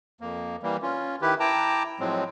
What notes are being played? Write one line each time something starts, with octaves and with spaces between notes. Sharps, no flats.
F2 A#3
E3 G3 A#3
C#4 F4
D#3 E4 G4 B4
E4 G5 A5 A#5 D6
A2 F3 F#3 G#3 C4